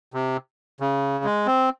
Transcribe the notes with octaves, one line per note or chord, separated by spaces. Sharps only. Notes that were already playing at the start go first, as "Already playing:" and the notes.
C3
C#3
G#3
C4